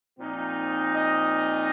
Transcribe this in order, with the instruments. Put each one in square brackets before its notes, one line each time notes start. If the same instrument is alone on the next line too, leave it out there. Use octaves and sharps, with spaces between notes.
[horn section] A#2 F3 C4 D#4
[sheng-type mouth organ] D#5